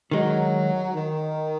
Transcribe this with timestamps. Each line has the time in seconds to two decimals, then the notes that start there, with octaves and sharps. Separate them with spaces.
0.11 D#3 F#3 G#3 D#4
0.94 D#3